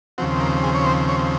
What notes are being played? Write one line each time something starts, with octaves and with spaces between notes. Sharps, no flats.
D#2 C#3 F3 C4 F#4
A#4
G#4
C#5
C5
C#5